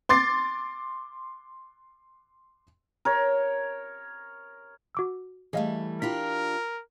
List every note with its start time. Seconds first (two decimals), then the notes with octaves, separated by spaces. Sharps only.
0.09 C6 D6 A6 C7
3.05 A#4 C#5
4.95 F#4 D6 E6
5.53 E3 G3 A3 G#4 D#5 F5
6.02 D4 E4 F4 G4 A#4 B6